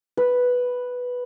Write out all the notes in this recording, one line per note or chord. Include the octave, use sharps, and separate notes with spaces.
B4